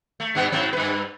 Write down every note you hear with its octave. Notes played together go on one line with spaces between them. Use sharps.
A3
G2 B2 B3
G#2 F#3 C4
G2 B4